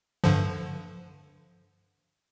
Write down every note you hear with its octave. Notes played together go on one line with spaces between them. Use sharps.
G2 D3 F3